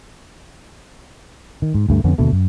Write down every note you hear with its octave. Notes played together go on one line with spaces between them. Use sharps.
D#3
G#2
D2 G2 A3
F2 D3 B3 C#4
D#2 B2 D3 A3
F#2